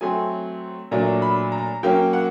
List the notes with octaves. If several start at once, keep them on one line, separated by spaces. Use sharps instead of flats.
F#3 A3 C4 G#5
A#2 F#3 A3 D4 A#5
B5
A#5
F#3 A#3 C#4 G5
F#5